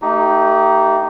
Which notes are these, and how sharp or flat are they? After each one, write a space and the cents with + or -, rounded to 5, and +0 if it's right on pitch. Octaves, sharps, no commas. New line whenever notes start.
A3 +25 D#4 +0 G4 -25